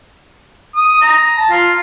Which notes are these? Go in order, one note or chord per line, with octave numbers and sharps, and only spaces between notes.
D#6
A#5
A5
F4